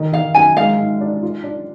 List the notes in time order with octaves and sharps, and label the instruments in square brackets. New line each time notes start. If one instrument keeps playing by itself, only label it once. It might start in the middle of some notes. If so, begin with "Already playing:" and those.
Already playing: [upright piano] D#3
[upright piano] D#3 [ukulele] F5
[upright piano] F#2 [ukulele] G#5
[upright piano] G#3 [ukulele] F5
[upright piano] G#2
D4
F4
D4